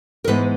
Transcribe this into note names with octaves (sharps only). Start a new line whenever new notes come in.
A#4
G#2 E3 G#3 B3 B4